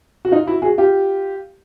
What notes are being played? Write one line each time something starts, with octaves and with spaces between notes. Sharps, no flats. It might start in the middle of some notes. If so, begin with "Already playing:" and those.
F#4
D#4 F4
E4 F#4
F#4 G#4
F4 G4